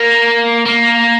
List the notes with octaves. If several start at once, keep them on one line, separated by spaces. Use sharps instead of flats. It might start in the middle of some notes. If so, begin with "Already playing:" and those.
Already playing: A#3
A#3